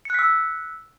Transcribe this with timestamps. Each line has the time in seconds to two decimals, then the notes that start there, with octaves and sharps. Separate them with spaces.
0.05 C#7
0.10 F#6
0.14 B6
0.19 E6